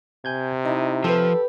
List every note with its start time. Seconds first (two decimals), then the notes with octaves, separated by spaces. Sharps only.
0.25 C3 G#5 G6 G#6
0.65 D#4 E4 D#5
1.04 F3 G4 A4 B4